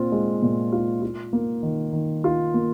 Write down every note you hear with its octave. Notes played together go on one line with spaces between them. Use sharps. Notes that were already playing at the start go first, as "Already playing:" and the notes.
Already playing: A#2 C4 F4
G#3
A#2
F4
F4
A#3
D#3
D#3
F4
A#3